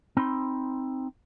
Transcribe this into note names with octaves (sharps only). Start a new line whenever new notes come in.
C4 D#4 B5 C6